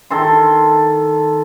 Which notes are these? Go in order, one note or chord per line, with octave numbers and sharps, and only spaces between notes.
D#3 A4 C6